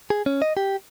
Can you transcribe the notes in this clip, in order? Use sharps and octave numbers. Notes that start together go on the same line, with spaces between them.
G#4
C#4
D#5
G4